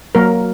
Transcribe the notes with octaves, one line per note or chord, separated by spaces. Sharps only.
F#3 A#3 A#4